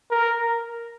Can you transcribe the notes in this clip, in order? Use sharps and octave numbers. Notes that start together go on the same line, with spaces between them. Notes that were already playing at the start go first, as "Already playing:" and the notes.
A#4